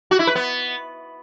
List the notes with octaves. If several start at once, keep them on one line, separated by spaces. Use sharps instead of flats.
F#4
E4
B4
B3